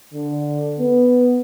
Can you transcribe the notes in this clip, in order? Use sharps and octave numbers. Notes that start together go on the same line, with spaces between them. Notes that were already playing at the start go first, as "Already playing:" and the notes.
D3
B3